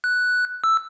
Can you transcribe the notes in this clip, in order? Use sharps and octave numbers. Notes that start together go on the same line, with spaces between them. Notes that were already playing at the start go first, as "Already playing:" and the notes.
F#6
E6